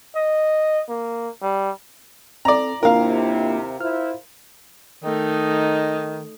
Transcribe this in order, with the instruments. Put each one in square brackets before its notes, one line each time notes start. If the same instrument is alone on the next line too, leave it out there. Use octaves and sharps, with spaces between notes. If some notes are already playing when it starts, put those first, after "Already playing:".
[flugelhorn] D#5
A#3
G3
[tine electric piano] C4 A4 [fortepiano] D5 A#5
[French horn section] D#2 C3 E4 [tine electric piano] A#3 D4 F4 [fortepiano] A#4 F5
[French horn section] E4 F4 C5 [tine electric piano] F6
[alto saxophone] D#3 [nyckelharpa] A3 D#4